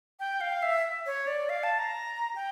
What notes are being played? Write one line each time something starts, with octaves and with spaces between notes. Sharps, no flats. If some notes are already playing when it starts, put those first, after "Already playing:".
G5
F5
E5
C#5
D5
F5
A5
A#5
G5